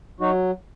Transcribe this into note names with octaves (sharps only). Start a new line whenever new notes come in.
F#3 D#4 F#4